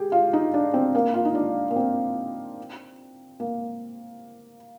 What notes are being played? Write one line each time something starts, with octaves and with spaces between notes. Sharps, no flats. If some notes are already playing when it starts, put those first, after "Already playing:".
Already playing: G4 G#4
F4
D#4
D4
C4
A#3
F4
D#4
D4
A#3
C4
A#3